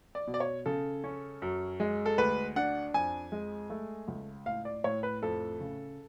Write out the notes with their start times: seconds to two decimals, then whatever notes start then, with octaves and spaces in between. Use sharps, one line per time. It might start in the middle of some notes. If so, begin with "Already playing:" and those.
0.15 D5
0.27 B2
0.34 D5
0.40 C#5
0.66 C#3 A4
1.04 C#4
1.42 F#2
1.80 G#3
2.06 A4
2.18 D2 B4
2.56 D4 F#5
2.94 F2 G#5
3.32 G#3
3.70 A3
4.08 C#2
4.46 A2 F5
4.65 D5
4.84 A2 C#5
5.03 B4
5.22 F2 A4
5.60 C#3